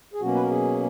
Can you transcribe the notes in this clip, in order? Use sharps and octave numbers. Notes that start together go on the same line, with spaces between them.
G#4
B2 F#3 A#3 C#4 F#4
B4
A#4
G#4